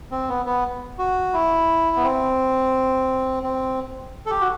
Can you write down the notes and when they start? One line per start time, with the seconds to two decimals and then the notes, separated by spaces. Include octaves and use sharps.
0.11 C4
0.29 B3
0.46 B3
0.98 F#4
1.33 E4
1.96 B3
2.03 C4
3.43 C4
4.26 A4
4.30 G4
4.41 F#4